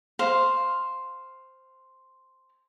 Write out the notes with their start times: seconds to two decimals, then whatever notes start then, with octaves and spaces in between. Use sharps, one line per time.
0.19 C5 F5